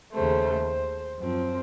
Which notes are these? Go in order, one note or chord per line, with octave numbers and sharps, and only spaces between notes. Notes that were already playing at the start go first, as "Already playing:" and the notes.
D#2 C#3 A3 C5
C5
F#2 F3 C4 C5